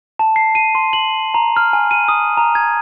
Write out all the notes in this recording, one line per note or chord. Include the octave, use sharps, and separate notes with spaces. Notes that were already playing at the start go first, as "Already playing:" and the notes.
A5
C7
D#7
C6
F#7
A#5
F6
G#5
D#7
D#6
A#5
G#6